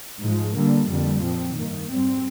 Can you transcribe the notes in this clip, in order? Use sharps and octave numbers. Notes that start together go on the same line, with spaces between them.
G#2 F3 G#3
D3 G3 A#3
F2 D3 G3 A#3
A#2 F3 C4
G2 D#3 A#3
G#2 G3 C4